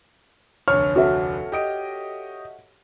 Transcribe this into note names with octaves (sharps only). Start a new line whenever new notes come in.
F1 D2 C#5 C#6 F6
F#4 A4 E5
G4 D#5 D7